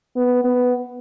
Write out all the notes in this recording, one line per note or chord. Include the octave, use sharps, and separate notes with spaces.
B3
B3